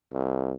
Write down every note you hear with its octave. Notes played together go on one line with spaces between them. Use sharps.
C2